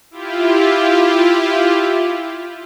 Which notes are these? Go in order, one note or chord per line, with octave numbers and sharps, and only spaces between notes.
E4 F4 G4